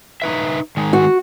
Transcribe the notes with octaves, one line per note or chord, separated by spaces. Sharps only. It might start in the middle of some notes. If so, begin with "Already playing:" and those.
D#4 B4 E5
D#3 G#3
F#4